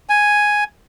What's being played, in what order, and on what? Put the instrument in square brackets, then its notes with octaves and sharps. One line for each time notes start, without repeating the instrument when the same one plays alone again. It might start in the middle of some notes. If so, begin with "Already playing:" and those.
[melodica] G#5